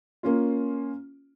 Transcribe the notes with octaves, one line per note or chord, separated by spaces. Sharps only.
A#3 C#4 F4